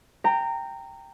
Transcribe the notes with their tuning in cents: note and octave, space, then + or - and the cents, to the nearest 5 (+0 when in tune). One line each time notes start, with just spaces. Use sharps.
G5 +0 A#5 -20